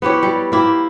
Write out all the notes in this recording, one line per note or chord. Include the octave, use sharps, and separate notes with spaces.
B3 E4 G4 C#5
G3
A#3 E4 G4